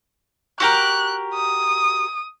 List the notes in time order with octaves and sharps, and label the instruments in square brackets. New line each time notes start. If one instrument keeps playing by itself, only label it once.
[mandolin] F#4 G4 A#4 [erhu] F#6
[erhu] D#6